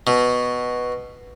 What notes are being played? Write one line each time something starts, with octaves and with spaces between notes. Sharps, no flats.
B2